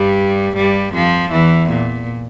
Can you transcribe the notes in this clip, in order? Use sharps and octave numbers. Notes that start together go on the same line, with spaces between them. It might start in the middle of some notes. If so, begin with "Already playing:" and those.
Already playing: G2 G3
G2 G3
F2 F3
E2 E3
A#2